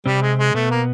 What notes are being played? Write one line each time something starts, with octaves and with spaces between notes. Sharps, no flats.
C3 G3 C4
G#3
G#3
B2 A3 B3
A#3